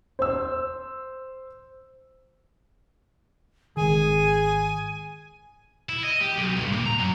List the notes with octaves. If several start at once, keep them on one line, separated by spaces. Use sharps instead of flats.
C5 E6
G#1 D#3 G#4 G#5
E4
D#5
G4
B1
G2
A#2
A#5
F#2